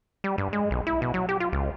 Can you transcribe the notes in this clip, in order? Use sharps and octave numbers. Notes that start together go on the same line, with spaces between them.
G3
G2
G#3
B1
E4
B2
F#3
G4
F4
C#2